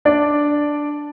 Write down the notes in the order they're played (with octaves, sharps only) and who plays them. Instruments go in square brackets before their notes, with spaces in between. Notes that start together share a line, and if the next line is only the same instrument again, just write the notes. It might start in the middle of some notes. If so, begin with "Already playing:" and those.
[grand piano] D4 D5